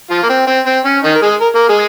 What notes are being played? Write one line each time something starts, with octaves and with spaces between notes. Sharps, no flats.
F3 F4
A#3
C4
C4
C4
C#4
D#3 D#4
A#4
G#3 G#4
A#4
A#3 A#4
G#3 G#4